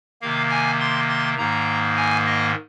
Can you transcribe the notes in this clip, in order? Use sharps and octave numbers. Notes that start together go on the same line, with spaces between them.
C3 D#3 A#3 F5
G#5
C6
C6
G#2 D#3 A#3 A#5
G#5
D#5